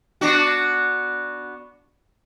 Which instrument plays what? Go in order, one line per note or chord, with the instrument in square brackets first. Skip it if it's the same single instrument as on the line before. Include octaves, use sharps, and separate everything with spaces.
[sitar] B3 D4 F#4